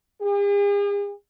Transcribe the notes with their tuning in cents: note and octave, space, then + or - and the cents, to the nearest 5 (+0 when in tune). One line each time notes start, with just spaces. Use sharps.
G#4 -45